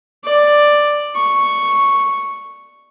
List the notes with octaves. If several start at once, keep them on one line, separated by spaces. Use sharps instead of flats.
D5
C#6